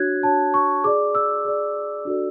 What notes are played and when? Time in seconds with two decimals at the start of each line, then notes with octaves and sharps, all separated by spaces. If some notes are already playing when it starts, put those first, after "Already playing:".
Already playing: D4 F#4 C#5 F#6 G#6
0.23 D4 F#4 C#5 A5
0.54 C#6
0.84 G#4 D5 D6
1.15 E6
1.45 G#4 D5
2.05 D4 F#4 A4 D5